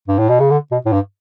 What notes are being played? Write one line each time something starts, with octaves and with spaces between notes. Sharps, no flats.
G2
A2
B2
C#3
D3
B2
A2
G2